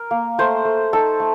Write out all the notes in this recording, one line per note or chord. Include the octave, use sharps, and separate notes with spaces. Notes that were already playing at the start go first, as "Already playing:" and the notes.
Already playing: A#4
A#3
A3 C5
A3
D#4 A4
A3